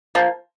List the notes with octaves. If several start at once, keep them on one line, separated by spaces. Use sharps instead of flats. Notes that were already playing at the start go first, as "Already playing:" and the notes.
F3 A#3